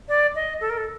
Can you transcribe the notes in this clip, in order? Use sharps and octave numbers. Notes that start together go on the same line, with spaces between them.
D5
D#5
A4
A#4
A4